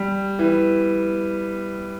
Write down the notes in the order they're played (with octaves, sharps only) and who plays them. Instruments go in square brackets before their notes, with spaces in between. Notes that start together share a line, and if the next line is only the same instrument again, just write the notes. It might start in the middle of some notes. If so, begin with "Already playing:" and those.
Already playing: [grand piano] G3
E3